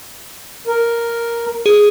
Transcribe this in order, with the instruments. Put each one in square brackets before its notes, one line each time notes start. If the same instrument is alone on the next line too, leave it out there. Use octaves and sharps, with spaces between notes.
[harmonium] A#4
[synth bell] G#4